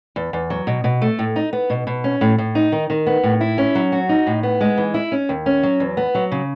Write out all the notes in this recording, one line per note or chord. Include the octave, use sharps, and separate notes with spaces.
E2
E2
F#3
B2
B2
A3
A2
D#4
B3
B2
B2
C#4
A2
A2
D#4
D#3
D#3
B3
A2
E4
C#4
F#3
F#4
D#4
A2
B3
G#3
E3
E4
C#4
D#2
C#4
F#3
E2
B3
F#3
C#3